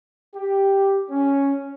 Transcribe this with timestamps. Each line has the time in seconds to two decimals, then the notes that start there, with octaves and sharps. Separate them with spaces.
0.36 G4
1.10 C#4